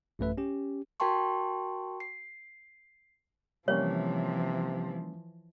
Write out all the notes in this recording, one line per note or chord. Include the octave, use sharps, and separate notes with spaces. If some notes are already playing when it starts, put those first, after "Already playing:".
A1 F#2 A3 B4 E5
C#4 G4
F#4 A#4 G5 A5 C6 C#6
C7
C3 E3 F3 G3 A#3 C#4 C#5